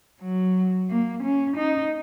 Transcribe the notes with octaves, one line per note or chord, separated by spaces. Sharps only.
F#3
A#3
C#4
D#4